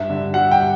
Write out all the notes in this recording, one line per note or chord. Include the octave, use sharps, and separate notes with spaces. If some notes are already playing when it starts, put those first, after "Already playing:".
Already playing: G2 G3 E5
D3
G3 F#5
G5